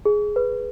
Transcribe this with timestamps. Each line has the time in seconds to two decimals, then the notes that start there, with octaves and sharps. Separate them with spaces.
0.05 G#4
0.36 B4